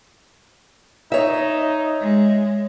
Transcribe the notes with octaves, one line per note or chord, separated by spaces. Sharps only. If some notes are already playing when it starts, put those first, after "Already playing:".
D#4 C#5 E5
G#3